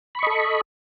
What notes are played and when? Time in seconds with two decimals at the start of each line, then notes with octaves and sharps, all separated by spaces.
0.15 B5
0.19 C#6
0.23 D#5
0.27 A4